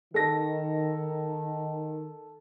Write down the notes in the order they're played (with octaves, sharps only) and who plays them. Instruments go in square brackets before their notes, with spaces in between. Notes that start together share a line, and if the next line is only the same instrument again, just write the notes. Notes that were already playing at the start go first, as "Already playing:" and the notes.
[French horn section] D#3 [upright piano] A4 A#6